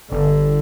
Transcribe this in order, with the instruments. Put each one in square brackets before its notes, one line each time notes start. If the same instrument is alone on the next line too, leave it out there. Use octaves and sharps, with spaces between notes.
[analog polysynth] G1 [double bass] D3